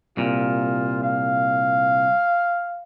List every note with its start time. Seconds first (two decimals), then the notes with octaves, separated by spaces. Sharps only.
0.17 C2 A#2 F4
1.03 F5